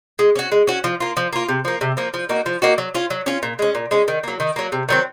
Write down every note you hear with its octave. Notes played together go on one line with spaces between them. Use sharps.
G#3
C#4 F#4
G#3
C#4 F#4
F3
A#3 F4
F3
A#3 F4
C3
F3 A#3
C3
F3 A#3
F3
A#3 D#4 F#4
F3
A#3 D#4 F#4
F#3
C#4 F4
F#3
C#4 F4
A#2
G#3 C#4
A#2
G#3 C#4
D#3
F#3 A#3
D#3
F#3 A#3
C3
D#3 F#3 C4